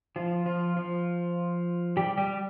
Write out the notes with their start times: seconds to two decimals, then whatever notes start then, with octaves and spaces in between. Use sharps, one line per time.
0.16 F3 F4
0.46 F3 F4
0.76 F3 F4
1.97 G3 G4
2.17 G3 G4